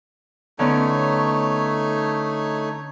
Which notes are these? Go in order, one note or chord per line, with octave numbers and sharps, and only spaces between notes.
D3 A3 B3 C#4 D#4 C#5